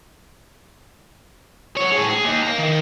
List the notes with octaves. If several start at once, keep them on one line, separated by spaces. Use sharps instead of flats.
F#3 C#5
A2 G#4
G#4
D#2
F5 A#5
D#3